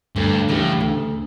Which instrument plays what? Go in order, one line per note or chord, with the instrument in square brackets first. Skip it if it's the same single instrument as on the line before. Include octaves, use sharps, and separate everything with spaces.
[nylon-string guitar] D2 [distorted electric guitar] G2
[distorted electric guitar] A2 [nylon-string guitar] C#3 E3 G3
[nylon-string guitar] D2